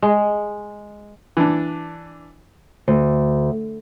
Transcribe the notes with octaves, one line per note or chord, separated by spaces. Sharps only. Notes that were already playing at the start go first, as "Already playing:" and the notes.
G#3
E3 D4
D2